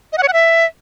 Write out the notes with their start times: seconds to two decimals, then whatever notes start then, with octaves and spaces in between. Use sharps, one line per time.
0.13 D#5
0.18 F#5
0.23 C#5
0.28 F#5
0.33 E5